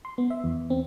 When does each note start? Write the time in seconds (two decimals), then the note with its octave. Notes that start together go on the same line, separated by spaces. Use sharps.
0.05 C6
0.18 B3
0.30 E5
0.44 E2
0.70 C4